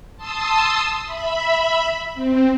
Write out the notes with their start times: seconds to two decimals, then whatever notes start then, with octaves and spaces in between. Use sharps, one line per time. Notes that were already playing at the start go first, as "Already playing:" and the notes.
0.17 A5 C6 D#6 E6
1.05 E5 B5
2.15 C4